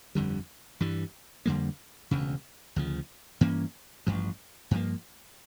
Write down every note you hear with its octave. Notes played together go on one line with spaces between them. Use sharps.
G1 F2 D3 G3
G2 E3 G3
F2 D3 G3 A#3
E1 D2 C#3
D2 C#3 F3
G2 E3 A#3 C#4
A1 G2 F3
G2 F3 A#3